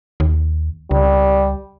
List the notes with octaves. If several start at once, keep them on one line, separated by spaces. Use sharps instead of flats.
D#2
C#2 G3